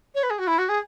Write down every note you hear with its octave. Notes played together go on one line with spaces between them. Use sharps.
C#5
B4
G#4
F#4
E4
F#4
G#4